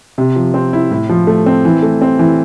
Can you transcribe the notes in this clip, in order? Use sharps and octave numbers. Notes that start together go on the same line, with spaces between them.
C3
F3
C4
E4
A2
F3
A3
C4
E3
A3
C4
E3